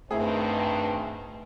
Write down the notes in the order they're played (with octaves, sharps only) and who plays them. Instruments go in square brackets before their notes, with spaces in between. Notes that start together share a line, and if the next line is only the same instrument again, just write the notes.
[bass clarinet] G2 [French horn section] B2 D#3 C4 [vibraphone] A3 [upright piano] E4 G#4